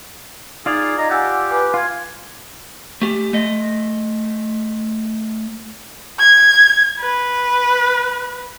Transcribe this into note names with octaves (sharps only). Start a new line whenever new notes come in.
D#4 F4 G#4 D5 F5
D#5 A#5
G4 F#5 G#5 E6 F#6
B4 G#5 D6
F4 F5 G#6
A3 G4
A3 D#5
G#6
B4